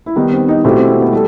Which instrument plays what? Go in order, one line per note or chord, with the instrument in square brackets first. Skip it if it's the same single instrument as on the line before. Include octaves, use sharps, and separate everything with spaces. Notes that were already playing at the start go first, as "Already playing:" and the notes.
[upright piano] E4
[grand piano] D#3 G3 B3 [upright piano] D#4
[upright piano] C4
D#4
[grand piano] B2 A3 E4 G4 [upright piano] C4
[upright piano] C4
C4
B3
[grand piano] G3 [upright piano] A3